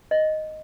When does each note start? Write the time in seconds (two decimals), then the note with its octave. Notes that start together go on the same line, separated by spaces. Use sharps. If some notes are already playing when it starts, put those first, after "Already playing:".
0.11 D#5